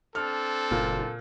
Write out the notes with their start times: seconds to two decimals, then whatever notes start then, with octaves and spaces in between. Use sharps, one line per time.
0.15 C4 D4 A4 F6
0.71 F#1 A#2